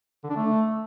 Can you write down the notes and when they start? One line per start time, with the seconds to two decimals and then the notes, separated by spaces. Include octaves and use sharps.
0.24 D3
0.30 D4
0.36 A3